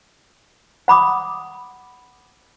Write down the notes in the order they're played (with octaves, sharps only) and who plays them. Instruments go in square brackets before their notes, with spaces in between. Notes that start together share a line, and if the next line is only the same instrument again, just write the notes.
[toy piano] F#5 B5 D6 D#6